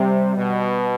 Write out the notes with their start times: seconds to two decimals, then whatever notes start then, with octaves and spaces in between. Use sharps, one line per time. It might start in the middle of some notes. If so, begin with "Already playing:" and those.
Already playing: C3 G3
0.36 B2